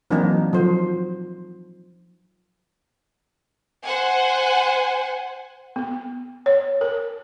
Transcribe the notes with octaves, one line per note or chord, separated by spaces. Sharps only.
E3 F#3 A#3 C4 D4 D#4
F3 F#3 C5
C5 F#5 G#5
B3
C#5
A#4